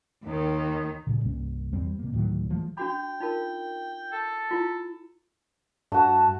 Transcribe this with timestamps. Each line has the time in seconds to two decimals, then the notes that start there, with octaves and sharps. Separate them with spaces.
0.24 D#2 D#3
1.07 G2 A#2 C#3
1.25 C2 G2 A#3 C#4
1.72 E2 G3 C4
1.99 C3 A#3
2.13 D2 A2 D#3 F#3
2.50 E3 F3 G#3 A3
2.77 D4 F#4 G5 B5
3.20 D#4 F4 A#4
4.12 A4
4.51 E4 F4
5.92 G2 A3 F#4 A5